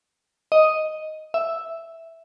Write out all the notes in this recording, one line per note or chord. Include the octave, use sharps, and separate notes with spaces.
D#5
E5